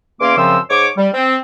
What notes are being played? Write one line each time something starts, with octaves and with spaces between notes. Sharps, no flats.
E2 A#3 C#4 C6 D6
F#2 C#3 F3 C4 C6 E6
G#2 C#5 C#6 D6
G3
C4